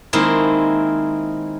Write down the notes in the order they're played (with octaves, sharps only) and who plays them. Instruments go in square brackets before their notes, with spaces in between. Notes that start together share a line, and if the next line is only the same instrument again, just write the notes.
[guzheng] D#3 G#3 A#3 C4 E4